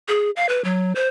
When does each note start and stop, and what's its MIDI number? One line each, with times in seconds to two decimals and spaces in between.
0.08 0.30 68
0.36 0.49 77
0.49 0.63 71
0.64 0.93 54
0.95 1.08 72